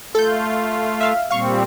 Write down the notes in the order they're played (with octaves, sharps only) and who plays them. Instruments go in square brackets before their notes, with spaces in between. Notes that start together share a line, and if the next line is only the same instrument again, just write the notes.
[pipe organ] A3 F4 [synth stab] A4 G6
[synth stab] E5 F5
[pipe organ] A#2 G3 C4 [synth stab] F5 C#6